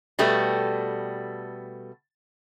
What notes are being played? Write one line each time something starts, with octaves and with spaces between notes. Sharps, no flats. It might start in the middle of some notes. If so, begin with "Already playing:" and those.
B2 G3 A3 B3 A4